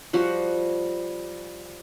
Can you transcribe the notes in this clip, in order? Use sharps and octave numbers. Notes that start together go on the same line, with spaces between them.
F3 G3 F#4